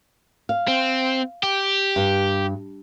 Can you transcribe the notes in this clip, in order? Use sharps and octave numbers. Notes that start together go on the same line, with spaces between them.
F5
C4
G4
G2